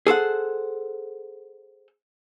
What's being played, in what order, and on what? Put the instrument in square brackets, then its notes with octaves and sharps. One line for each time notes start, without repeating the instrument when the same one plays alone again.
[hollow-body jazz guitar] G#4 A4 C5 F#5